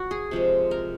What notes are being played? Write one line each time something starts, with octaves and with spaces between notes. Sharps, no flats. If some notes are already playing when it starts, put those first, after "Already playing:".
Already playing: F#4
G#4
C3 F3 G#3
A#4